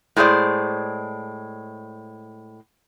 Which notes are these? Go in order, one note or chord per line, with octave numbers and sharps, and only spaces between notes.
A2 G#3 G#4 C5 D5